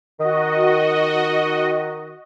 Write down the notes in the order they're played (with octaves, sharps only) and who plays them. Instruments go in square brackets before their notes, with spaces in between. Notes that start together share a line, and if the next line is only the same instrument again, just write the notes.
[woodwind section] D#3 [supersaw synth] F#4 D#5